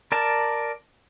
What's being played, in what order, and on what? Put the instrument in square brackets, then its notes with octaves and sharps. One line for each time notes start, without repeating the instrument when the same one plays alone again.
[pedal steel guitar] A#4 D5 A5